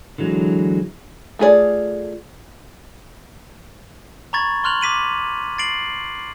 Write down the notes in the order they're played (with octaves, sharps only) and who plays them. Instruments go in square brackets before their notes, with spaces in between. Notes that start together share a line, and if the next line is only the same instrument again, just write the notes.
[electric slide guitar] D3 E3 F#3 G#3
[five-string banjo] A3 F4 G#4 B4 D5
[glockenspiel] A#5 B5 C#6 G#6 A6
C6 C#6 F6 F#6 F7 F#7
D6 B6 D#7 F#7
A6 C7 D7 F#7